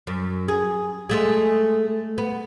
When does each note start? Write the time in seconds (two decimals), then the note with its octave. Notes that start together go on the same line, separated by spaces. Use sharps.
0.07 F#2
0.48 G#4
1.09 G#3 A3 G#4
2.18 B3